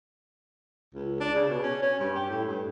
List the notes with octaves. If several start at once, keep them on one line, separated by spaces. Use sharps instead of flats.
C#2
D4
C#3
B2
C#4
C#4
G2
G4
A2
G2